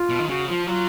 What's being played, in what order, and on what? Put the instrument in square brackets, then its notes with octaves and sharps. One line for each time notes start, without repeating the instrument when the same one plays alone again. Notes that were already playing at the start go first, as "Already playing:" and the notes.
Already playing: [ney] F4
[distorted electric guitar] B2
D#3
[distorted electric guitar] C#3 [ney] F#4
[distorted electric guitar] F3 [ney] F4
[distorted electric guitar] F#3 [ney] F4